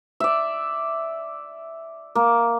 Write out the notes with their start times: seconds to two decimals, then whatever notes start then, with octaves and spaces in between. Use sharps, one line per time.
0.20 D5 E5
2.15 A#3